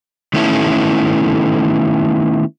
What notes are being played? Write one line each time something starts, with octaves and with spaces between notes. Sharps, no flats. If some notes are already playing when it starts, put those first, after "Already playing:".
D#3 A3 B3 C#4 E4 A4